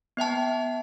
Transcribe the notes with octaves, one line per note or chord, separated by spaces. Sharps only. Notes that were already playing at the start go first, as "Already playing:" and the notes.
B3 E5 G5 A5